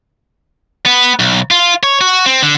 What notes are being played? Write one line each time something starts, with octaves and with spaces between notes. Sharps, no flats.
B3
B1
F4
C#5
F#4
C4
D3